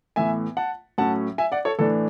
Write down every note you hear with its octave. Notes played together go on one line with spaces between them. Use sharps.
A2 E3 B3 E5 G#5
F#5 A5
A2 F#3 C#4 F#5 A5
E5 G#5
D5 F#5
A4 C#5
A2 E3 A3 D4 A4